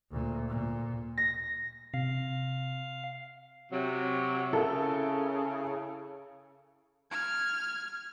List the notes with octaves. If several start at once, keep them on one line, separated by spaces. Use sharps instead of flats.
D2 A#2
A#2
A#6
C3 F5
C3 F#3
C#3 E4 A4 A#4
F6 G#6